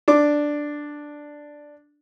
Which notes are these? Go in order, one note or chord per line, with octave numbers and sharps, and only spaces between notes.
D4 D6